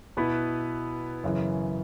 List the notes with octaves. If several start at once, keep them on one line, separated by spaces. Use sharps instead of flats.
B2 B3 E4 B4
F#2 C#3 E3